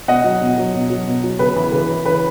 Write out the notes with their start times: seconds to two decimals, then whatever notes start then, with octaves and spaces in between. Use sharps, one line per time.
0.08 B2 D#5 F#5
0.24 F#3
0.41 B2
0.58 F#3
0.74 B2
0.90 F#3
1.07 B2
1.24 F#3
1.39 C#3 B4
1.56 E3
1.72 C#3 B4
1.89 E3
2.05 C#3 B4